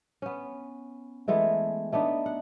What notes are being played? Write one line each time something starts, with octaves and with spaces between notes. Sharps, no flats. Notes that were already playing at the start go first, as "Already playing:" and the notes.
B3 C#4
E3 G#3 A3 B3
A3 B3 D4 D#4
F#5